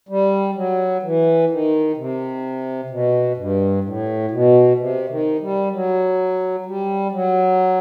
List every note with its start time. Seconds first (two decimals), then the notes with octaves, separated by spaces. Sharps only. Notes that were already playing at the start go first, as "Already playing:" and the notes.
0.09 G3
0.55 F#3
1.03 E3
1.50 D#3
1.97 C3
2.90 B2
3.37 G2
3.84 A2
4.31 B2
4.78 C3
5.09 D#3
5.41 G3
5.72 F#3
6.66 G3
7.12 F#3